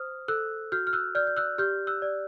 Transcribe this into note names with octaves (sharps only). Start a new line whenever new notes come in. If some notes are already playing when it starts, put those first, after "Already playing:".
Already playing: C5 D#6 F6
A4 E6 F#6
F#4 F6 G6
F6
E6 F#6
D5 F6 G6
G6
E6 F#6
G4 F6 G6
E6 F#6
D5